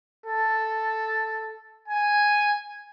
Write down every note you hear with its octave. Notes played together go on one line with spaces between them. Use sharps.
A4
G#5